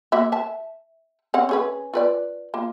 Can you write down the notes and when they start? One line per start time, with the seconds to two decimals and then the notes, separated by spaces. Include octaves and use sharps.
0.12 A#3 F#4 E5
0.32 E5 A5
1.34 C4 C#4 F#5
1.49 C#4 G#4 B4
1.94 F4 B4 D5
2.54 A#3 F4